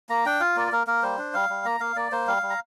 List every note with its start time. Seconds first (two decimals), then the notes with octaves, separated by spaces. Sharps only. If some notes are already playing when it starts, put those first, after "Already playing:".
0.09 A#3 A#5
0.26 D4 G5
0.40 F4 F5
0.56 A#3 D5
0.72 A#3 A#4
0.87 A#3 A#4
1.03 G3 C5
1.18 D4
1.34 G3 F5
1.49 G3
1.65 A#3 A#5
1.80 A#3 F5
1.96 A#3 D5
2.12 A#3 C5
2.27 G3 F5
2.42 G3
2.50 A#5